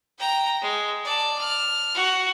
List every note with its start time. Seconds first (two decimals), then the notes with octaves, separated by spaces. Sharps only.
0.19 G5 A#5
0.62 G#3
1.05 D5 A5
1.38 F6
1.95 F#4